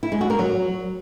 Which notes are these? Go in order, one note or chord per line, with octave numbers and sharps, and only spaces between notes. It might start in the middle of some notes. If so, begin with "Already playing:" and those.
E4
G#3
F#4
A#4
F#3